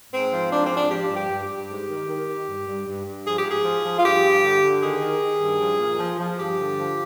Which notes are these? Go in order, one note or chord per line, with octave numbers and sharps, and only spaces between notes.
G#2 C4
F3
G#2 D4
C4
F3
D4
F3 G4
G2
G4
G2
G4
G2
G#2
D#3
D#3
D#3
G2
G2
G2
G2
F3 G#4
G4
G#2
G#4
F3
F3
F4
G2 G4
G2
D3
D3
D#3 G#4
D#3
D#3
G2
F3
A#2
F3
F3
G2 G4
D3
F3